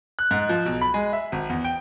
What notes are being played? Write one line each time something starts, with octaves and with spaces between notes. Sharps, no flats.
F#6
G#2
F3
B1
B5
G#3
E5
G#1
E2
G5